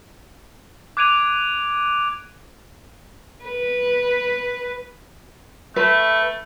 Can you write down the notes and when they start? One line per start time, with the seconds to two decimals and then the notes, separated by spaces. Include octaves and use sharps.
0.97 D6 F#6 G#6 D7 D#7 F7
3.45 B4
5.76 A3 B4